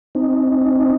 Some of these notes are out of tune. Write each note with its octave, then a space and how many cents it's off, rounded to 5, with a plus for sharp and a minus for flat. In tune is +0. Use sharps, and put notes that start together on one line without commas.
C4 +0 D#4 +0